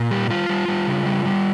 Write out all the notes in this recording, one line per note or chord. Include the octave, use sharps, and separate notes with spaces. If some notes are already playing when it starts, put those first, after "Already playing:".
Already playing: A#2
G3 G4
G3 F4
G3
G3
C#3
G3
G3